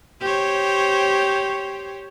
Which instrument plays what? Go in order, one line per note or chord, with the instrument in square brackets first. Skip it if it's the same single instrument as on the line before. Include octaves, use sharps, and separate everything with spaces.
[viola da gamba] G4 C5 C#5